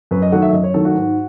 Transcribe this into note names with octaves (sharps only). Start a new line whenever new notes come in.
F#2 B4
D#5
D#3 F#3 A3 F#5
E5
F#2 D#5
C#5
D#3 F#3 A3 A4
F#4
G#2